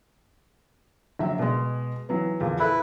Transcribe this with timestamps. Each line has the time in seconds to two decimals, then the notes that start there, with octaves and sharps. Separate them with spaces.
1.19 A#1 F#3 E5
1.39 B2 G#3
2.09 E3 F#3 B3
2.41 E2 A#2 F3
2.60 E4 A4 B4